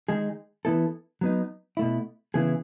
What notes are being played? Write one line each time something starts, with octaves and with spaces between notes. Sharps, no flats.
D#3 G#3 D#4 G#4
E3 B3 E4 A4
F#3 B3 D#4
B2 A3 E4
C#3 E3 B3 E4 G#4